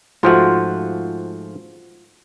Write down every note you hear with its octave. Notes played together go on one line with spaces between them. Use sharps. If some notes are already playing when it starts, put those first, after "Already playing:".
G#2 F3 A3 F4 F#4